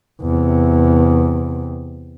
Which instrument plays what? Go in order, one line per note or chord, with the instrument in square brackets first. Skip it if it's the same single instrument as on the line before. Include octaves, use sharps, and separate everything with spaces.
[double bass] E2 C3